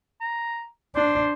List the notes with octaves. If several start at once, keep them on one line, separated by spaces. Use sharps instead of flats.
A#5
D4 C5